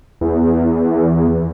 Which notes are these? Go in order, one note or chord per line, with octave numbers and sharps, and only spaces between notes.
E2